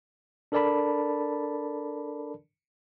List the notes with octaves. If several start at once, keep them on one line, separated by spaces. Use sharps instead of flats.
D4 A4 A#4 D5 A5 B5